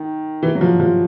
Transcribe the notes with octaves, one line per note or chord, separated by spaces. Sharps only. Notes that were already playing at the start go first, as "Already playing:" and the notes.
Already playing: D#3
E3
F#3
F3
F3